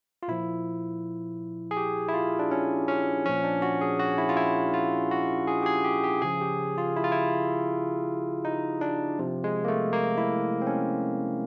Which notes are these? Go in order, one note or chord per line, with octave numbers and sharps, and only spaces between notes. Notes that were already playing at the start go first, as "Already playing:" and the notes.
F4
A#2 F3 E4
G#4
G4
E4
F4
D4
C#4
C#4
A#2 F3 C#4
D4
F#4
G#4
F#4
E4
F4
E4
F4
F#4
G#4
G4
G#4
G4
G4
C#3 F3 G#4
G4
F4
E4
F4
E4
D#4
D4
C3 F3
G#3
A#3
A3
A#3
E4
C4
C#4